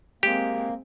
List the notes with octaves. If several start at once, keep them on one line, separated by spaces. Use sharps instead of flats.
G#3 A#3 C4 G4